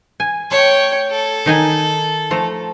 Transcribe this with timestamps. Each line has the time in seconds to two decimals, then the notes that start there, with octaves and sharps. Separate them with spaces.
0.20 G#5
0.51 A3 C#5 G5
1.11 A4
1.46 D#3 D#4 G#5
2.31 F3 A3 A#5